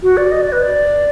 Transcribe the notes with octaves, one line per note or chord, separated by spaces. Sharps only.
F#4
D5
D#5
D5
B4
D5